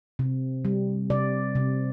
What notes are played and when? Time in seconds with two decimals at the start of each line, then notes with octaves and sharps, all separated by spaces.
0.19 C3
0.65 G3
1.10 C3 D5
1.55 C3